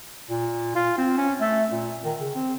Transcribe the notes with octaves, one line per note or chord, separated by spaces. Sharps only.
A#2
F4
C4
C#4
A3
A#2
D#3
C#3
C4